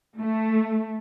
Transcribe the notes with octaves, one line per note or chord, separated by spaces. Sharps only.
A3